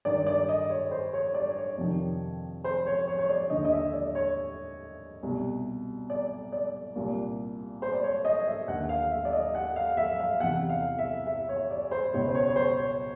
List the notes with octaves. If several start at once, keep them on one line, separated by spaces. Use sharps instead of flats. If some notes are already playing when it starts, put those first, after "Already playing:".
G2 D#3 D5
D5
D#5
C#5
C5
C#5
D5
C#5
F2 C3 D#3
C5
C#5
C#5
C#5
D5
D#2 D3 D#5
D#5
E5
D5
C#5
C2 B2
D5
D5
C2 A#2
C5
D5
C#5
D#5
E5
D#2 D3 F#5
F5
E5
D5
D#5
F#5
F5
E5
F5
E2 C3 E3 F#5
F5
E5
E5
C#5
D5
C5
C#2 B2 C#5
C5
C#5
C#5
C5
C#5